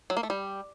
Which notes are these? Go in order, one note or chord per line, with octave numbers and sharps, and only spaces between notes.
F#3
A#3
A3
G3